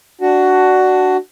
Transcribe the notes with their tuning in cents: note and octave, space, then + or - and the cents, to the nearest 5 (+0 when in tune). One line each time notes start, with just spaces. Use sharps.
D4 +0 F#4 +10